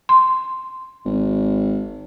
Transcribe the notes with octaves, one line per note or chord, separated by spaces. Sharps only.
C6
G#1